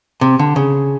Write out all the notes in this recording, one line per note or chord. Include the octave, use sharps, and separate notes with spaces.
C3
D3
C#3